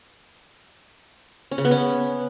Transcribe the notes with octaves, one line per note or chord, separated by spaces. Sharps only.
C#4
C#3
B3
C#4